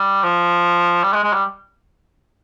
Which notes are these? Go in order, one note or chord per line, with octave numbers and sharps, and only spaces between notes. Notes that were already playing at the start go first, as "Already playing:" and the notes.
Already playing: G3
F3
G3
G#3
G#3
G3